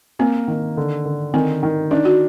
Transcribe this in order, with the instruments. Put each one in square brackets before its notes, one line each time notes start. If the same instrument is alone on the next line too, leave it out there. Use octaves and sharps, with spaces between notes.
[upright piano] A#3 [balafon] C4
[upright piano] D#3
D3
D3
[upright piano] D#3 [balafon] C4
[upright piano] D#3
[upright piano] D4 [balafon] D#4
[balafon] F#4